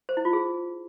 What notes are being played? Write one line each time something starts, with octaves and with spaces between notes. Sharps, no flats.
C5
E4
F4
G#4